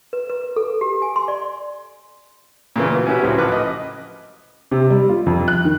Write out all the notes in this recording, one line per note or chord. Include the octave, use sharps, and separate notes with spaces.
B4
B4
A4
G4
G#5
C6
D5
A#2 C#3 E3
B2 B3
C#4 E4 F#4 G4 B4
C#2 A2 F#3 C4
A1 A2 F3 B4 D6 F#6
D#5 D6
C3
G3
F4
F2
F#6
D#3